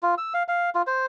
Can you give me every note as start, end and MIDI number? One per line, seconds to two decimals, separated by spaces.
0.03 0.15 65
0.18 0.33 88
0.34 0.43 77
0.48 0.70 77
0.75 0.82 65
0.87 1.06 72